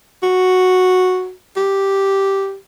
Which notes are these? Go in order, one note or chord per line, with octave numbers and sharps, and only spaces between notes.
F#4
G4